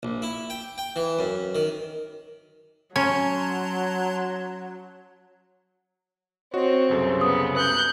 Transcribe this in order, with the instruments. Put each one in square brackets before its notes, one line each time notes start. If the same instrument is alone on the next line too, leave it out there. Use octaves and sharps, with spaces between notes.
[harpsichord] A#1
E4
G5
G5
E3
F#2
D#3
[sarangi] F#3 [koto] C#4 [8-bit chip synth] A5 A#5 C6
[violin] C4 [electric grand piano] F#4 D#5 [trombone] C#5
[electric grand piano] C2 F#2 A4 [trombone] C#3
[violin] B3 [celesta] D#6
[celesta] D#6 [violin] F#6 G6